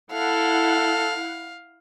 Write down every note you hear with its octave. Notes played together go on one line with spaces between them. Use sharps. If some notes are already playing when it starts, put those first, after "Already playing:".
E4 A4 F5 F#5